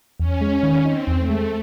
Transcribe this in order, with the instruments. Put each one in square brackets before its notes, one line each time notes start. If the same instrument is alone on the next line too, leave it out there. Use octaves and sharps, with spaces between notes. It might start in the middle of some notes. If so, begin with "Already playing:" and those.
[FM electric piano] E2 [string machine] C#4
[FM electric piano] G#3
D#3
[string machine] C4 [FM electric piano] D#4
[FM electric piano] E2
[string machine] A3
[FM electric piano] G#3